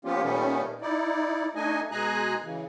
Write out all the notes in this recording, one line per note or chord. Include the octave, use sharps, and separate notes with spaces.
F3 A#3 B3 C#4 F4 G4
A#2 D#3 G3 A3 B3 C#4
D#4 E4 D5
A3 D4 D#4 D#5 G#5
B2 G#3 G#4 G#5 A#5 F#6
C#3 E3